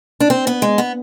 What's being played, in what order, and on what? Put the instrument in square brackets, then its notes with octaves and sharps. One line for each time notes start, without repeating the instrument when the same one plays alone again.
[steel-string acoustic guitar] D4
C4
B3
G#3
B3